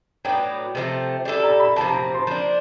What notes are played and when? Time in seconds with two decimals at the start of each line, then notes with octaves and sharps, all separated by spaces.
0.25 A2 F#3 B3 D4 G5
0.75 C3 F3 A3
1.25 G3 C4 E4 A4
1.43 A#5
1.60 B5
1.76 C3 F3 A#3 A5
1.89 A#5
2.14 C6
2.27 F3 A#3 D4